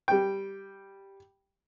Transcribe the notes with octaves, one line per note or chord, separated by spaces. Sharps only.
G3 G5